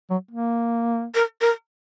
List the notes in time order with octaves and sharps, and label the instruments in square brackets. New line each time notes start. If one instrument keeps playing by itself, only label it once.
[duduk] F#3
A#3
[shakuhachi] A#4
A#4